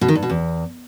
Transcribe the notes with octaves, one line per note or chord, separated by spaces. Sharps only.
B2
D#3
G2
B2
E2